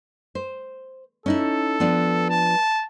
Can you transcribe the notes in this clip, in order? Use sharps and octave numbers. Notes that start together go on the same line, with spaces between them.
C5
C#4 D#4 E4 A4
F3 B3 D4
A5